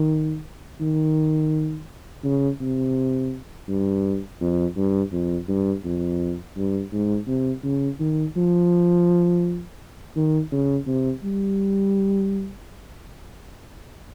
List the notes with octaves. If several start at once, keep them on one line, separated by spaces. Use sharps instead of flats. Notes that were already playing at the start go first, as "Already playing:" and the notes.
Already playing: D#3
D#3
C#3
C3
G2
F2
G2
F2
G2
F2
G2
G#2
C3
C#3
D#3
F3
D#3
C#3
C3
G3